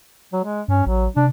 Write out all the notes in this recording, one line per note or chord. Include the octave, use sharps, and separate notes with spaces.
F#3
G#3
G2 C#4
A1 F#3
C3 D4